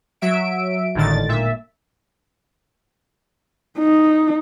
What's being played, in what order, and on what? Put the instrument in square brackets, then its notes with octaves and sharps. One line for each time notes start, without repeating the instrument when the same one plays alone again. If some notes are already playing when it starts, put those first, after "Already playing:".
[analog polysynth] F#3 E5 D7
G#1 A2 D3 D#3 A6
A#2 E5
[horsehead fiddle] D#4